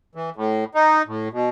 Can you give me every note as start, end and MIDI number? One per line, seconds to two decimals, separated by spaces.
0.15 0.30 52
0.36 0.64 45
0.75 1.02 63
1.07 1.28 45
1.32 1.49 47